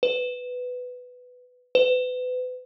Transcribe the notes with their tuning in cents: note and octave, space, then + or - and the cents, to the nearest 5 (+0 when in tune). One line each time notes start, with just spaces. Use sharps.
B4 +10
B4 +35